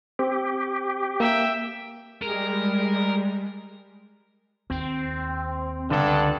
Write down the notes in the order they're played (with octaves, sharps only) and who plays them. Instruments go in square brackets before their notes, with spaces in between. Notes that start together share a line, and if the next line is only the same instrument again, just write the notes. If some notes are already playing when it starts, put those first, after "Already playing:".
[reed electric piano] C4 [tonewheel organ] G4
[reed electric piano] A#3 [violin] E5 G5
[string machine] G3 G#3 [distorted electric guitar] A#4
[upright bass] D#2 [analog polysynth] C4
[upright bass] C#2 [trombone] G2 [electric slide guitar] D3 [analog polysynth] D4 A4 F#5